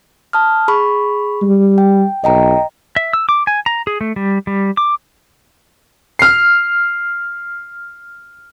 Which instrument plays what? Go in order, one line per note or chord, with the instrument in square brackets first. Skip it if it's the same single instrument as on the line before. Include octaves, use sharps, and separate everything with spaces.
[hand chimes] A5 D#6 F6
G#4 B5 C#6
[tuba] G3
[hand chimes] G5
[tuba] B1 [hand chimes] D#5 G5 A#5
[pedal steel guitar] E5
E6
D6
G#5
A#5
G#4
A3
G3
G3
D6
[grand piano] F6 C7